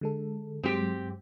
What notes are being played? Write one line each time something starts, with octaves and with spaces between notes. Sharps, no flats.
D3 G#3 A4
G2 F#3 G#3 C4 G4